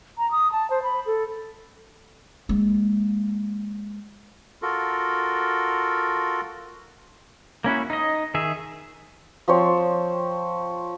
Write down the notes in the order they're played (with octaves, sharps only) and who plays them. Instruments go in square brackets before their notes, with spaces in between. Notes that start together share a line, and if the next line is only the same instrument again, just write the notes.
[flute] A#5
D#6
A5
C5
B5
A4
[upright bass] G#3 A#3
[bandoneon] F4 F#4 A4 A#4
[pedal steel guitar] A#3 C#4 E4 F#4
D#4 D#5
D#3 G#4 E5
[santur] F3 C4 C5 C#5